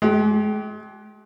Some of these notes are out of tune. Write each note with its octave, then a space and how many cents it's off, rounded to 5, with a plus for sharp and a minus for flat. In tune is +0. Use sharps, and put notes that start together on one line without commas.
G#3 +30 G4 -25